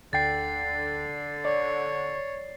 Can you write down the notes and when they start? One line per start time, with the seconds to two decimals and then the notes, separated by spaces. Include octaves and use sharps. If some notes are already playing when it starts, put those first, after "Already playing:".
0.13 D2 D3 G5 A6 C7
1.45 C#5 D5